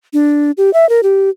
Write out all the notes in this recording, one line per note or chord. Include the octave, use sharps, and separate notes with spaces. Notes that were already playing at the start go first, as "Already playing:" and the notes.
D4
G4
E5
A#4
G4